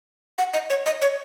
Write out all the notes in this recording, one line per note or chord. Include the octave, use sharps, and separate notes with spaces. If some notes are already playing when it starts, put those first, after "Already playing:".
F#5
D#5
C#5
D#5
C#5